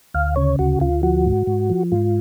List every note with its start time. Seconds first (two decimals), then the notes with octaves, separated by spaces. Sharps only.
0.14 D2 F5
0.36 C#3 C#5
0.59 D2 F#4
0.80 D2 F4
1.03 F3 F#4
1.26 G#2
1.47 G#2
1.70 F3
1.92 G#2 F4